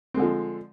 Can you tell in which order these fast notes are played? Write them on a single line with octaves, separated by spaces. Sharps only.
C4 G#3 D3 F3